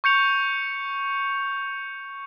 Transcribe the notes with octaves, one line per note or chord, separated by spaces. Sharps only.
C#6 G6 C#7 F7